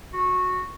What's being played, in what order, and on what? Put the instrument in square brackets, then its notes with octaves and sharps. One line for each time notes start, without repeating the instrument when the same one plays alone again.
[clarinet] F#4